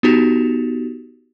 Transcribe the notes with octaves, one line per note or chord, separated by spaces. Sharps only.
B3 D#4 F#4 G4